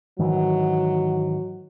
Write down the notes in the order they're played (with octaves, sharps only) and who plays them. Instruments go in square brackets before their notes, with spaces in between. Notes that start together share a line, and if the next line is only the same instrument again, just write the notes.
[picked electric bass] G#2 D#3 E3 [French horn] F#3